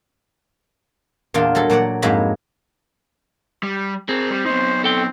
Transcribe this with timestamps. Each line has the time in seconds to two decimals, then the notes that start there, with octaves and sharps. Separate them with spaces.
1.34 E2 A#2 D4 F4
1.55 F#3 G3 A4
1.70 A#2 F#3 D5 F#5
2.02 F2 G#2 F#3 G#3 A#3 B5
3.63 G3
4.09 C4 G#4 A#4
4.30 G3
4.46 B3 D#4 C5
4.84 C4 A4 G5